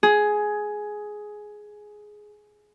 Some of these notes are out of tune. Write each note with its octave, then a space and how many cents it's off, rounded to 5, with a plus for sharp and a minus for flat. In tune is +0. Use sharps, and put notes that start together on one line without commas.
G#4 +10